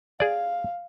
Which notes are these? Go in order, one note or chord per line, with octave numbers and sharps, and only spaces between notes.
G#4 D5 F5